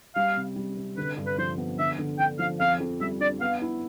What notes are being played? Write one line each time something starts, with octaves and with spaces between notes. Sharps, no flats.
G3 F5
C3
G3
C3
D3 B4
G2
B4
F3 C5
B3
D3 E5
D3
D3 G5
F3 F5
F2 F5
F2
G3 E5
D4 D5
B3 F5
E4